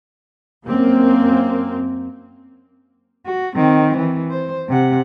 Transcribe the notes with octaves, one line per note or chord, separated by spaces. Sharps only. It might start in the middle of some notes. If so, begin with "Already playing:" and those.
F#2 A#3 C4
F#4
D#3 C4
E3
C5
C3 F#5